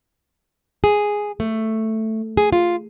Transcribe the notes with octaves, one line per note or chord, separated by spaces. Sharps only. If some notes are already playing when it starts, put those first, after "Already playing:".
G#4
A3
G#4
F4